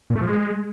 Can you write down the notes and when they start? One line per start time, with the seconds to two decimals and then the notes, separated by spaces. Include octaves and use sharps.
0.10 A#2
0.16 A3
0.21 F3
0.27 G#3